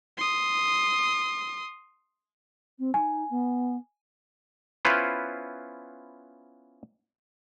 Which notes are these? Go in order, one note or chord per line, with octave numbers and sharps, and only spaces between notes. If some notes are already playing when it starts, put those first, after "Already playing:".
C6 D#6
C4
D#4 G#5
B3
B3 C#4 E4 F4 B4 C5